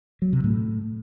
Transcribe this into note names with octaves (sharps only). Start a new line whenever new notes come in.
F#3
C3
A2